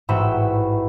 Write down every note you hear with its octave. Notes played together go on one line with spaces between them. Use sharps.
A1 G#2 F#4 E5 G5 B5